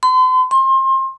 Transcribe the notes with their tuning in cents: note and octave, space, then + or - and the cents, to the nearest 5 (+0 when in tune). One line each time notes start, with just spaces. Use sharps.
C6 -40
C6 +30